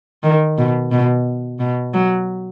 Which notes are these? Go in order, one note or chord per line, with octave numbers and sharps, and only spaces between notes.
D#3
B2
B2
B2
F#3